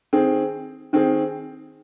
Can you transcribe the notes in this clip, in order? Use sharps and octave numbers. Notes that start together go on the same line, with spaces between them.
D#3 C4 G#4
D#3 C4 G#4